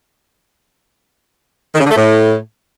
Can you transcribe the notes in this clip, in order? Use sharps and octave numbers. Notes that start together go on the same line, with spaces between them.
D#3
C#3
D3
A3
A2